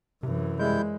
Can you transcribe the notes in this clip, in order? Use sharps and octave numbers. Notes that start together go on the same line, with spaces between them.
F#2 C3 E3
G3 G#3 E4 G6